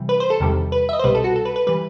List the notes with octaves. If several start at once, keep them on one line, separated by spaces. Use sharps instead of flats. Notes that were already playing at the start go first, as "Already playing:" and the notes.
Already playing: C3 E3 G3
B4
C5
A4
E2 C3 D#3 G3
B4
E5
D#5
C5
C2 B2 G3 B4
A4
F#4
A4
B4
B4
E3 G3 B4